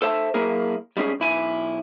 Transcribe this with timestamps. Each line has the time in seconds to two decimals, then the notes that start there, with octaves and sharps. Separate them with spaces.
0.02 A4 C5 E5 A5
0.34 F#3 A#3 E4 G#4 A#4
0.97 G3 G#3 C#4 G#4
1.20 B1 E4 G#5